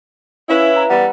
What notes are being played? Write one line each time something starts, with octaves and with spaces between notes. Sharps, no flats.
C#4 E4 B4 E5 F5
A#5
E3 G3 B3 F#5